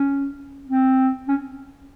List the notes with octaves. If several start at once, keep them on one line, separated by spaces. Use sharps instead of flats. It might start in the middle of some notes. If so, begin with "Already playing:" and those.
Already playing: C#4
C4
C#4